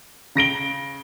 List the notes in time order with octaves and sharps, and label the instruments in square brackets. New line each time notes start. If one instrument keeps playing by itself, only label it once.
[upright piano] C#3 A#6 D7 G7